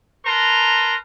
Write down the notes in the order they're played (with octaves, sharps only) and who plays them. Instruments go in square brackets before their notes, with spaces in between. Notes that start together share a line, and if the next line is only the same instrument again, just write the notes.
[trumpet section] A#4 B4 A5 A#5 C6